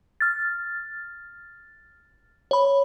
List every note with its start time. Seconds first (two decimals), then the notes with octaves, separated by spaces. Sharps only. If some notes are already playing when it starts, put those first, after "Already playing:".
0.21 F6 A6
2.51 C#5 B5